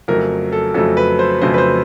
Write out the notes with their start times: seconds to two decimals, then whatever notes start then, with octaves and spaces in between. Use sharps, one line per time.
0.08 F2 C#3 F#3 A3 A#4
0.52 A4
0.74 F2 C#3 F#3 A3 A4
0.97 B4
1.19 C5
1.42 F2 C#3 F#3 A3 C5
1.54 B4
1.58 C5